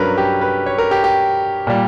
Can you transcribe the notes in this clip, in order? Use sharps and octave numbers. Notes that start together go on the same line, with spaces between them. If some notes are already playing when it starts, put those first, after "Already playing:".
Already playing: G2 F#3 C#4 A#4 B4
G4
B4
C#5
A#4
G4
G4
A#2 G3